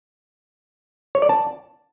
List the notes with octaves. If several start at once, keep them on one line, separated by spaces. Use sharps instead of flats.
C#5
D5
A5